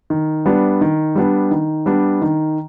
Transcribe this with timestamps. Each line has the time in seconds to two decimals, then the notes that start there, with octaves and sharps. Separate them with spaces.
0.10 D#3
0.46 G3 B3 D4
0.81 D#3
1.15 G3 B3 D4
1.51 D#3
1.86 G3 B3 D4
2.22 D#3